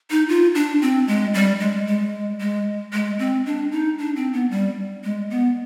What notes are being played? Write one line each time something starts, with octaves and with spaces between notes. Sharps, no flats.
D#4
F4
D4
C4
G#3
G3
G#3
G#3
G#3
G#3
C4
D4
D#4
D4
C4
B3
G3
G#3
B3